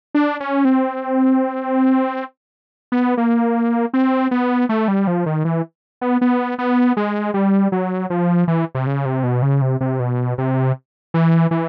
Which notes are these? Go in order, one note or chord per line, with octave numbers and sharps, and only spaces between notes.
D4
C#4
C4
B3
A#3
C4
B3
A3
G3
F3
D#3
E3
B3
B3
B3
G#3
G3
F#3
F3
E3
C3
C#3
C3
B2
C#3
C3
C3
B2
C3
E3
E3